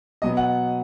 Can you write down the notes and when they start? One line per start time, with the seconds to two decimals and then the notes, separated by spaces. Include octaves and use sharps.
0.22 B2 F#3 B3 D#5
0.37 F#5